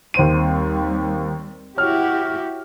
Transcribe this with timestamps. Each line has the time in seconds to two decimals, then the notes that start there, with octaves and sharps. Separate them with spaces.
0.14 D#2 G3 C4 C5 D#7
1.77 E4 F#4 G4 C#5 F6